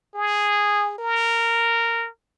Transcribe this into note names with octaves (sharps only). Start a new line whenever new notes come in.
G#4
A#4